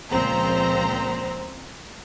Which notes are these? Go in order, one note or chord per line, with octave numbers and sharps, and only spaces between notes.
C#2 A#2 F3 C4 C5 A#5